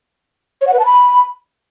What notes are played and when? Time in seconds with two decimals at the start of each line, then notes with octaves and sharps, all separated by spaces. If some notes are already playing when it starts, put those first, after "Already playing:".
0.61 C#5
0.67 F#5
0.73 B4
0.79 A5
0.85 B5